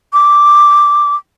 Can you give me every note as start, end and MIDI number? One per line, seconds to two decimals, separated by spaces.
0.13 1.15 86